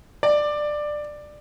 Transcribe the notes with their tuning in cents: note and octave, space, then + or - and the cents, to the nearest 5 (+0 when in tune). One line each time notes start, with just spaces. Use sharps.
D5 +15